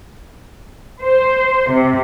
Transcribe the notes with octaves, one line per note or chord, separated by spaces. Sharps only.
C5
C3